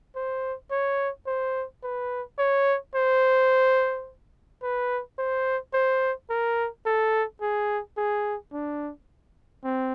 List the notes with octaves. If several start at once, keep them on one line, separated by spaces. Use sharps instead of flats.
C5
C#5
C5
B4
C#5
C5
B4
C5
C5
A#4
A4
G#4
G#4
D4
C4